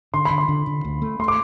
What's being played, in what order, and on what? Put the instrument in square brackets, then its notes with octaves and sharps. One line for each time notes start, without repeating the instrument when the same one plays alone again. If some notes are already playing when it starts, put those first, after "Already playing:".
[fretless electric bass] D3 [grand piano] C6
[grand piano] B5
[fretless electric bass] D3
[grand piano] C6
[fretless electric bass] D3
D3
D2
A3
[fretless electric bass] A3 [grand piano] C6
[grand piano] D6